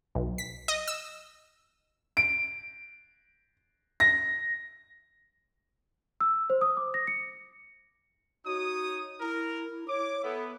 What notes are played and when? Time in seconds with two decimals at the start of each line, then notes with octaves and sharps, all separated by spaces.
0.15 B1
0.38 B6
0.68 D#5
0.88 E6
2.17 D7
4.00 A#6
6.21 E6
6.50 C5
6.61 D#6
6.77 D6
6.94 A#6
7.07 C#7
8.45 D#4 F#4 C#5 D#6
9.20 E4 A#4
9.88 C#5 D6
10.23 B3 E4 A4